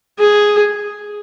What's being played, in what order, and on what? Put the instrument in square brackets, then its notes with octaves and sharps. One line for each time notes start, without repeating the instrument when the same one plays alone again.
[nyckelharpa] G#4